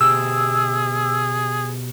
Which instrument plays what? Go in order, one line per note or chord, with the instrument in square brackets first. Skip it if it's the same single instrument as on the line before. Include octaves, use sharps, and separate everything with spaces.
[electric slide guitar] B2 G4 [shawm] G#4 [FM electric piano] E6